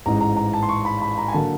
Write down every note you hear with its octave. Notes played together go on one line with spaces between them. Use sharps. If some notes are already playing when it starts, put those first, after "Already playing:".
A1 G#2 E3 G#3 A#5
A#5
A#5
A5
C6
C#6
B5
B5
A#5
G#5
D3 F#3 A#3 A5